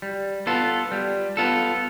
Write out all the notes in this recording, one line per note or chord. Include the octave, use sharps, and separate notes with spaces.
G3
B3 F4 A4
G3
B3 F4 A4